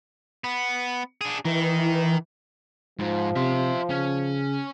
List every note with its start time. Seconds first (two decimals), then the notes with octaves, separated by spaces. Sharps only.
0.44 B3
1.21 D4 G#4
1.45 D#3 E3
2.99 G#2 F3
3.36 C3 E5 C6
3.90 C#3 C#4